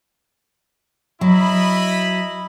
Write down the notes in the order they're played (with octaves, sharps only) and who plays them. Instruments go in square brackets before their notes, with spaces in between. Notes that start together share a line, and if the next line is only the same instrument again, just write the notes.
[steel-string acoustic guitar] F#3 [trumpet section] E4 D#5 B5